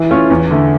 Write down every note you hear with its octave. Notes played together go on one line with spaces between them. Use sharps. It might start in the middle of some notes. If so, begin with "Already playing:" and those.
Already playing: E3
A3 C#4 F4
E2
D3 A3